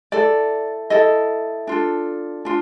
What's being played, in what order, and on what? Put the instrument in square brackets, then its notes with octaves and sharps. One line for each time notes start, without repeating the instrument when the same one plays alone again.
[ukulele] E4 A4 D5
E4 A4 D#5
D4 F4 A4
D4 F4